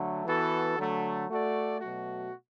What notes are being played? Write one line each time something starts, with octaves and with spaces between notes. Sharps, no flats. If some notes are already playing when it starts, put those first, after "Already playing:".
Already playing: D3 F#3 A3
E3 B3 F#4 A4
D3 F#3 A3
A3 F#4 A4 D5
B2 F#3 A3 F#4